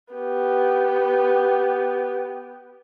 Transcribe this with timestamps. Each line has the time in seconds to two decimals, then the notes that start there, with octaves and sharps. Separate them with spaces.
0.14 B3 G4